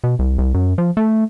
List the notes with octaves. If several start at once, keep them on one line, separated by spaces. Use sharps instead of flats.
B2
C2
C2
F#2
F3
A3